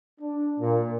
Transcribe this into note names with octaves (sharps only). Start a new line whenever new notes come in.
D4
A#2